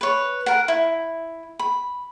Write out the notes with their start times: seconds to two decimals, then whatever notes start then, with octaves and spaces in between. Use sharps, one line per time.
0.01 B4 C#5
0.46 A#4 F#5
0.68 E4
1.59 B5